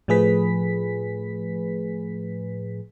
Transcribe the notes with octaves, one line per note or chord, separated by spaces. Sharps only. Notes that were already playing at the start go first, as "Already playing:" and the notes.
A2 F3 A3 G#4 B4 B6